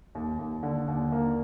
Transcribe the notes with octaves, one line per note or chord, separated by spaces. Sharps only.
D#2
D#2
D3
D#2
A#3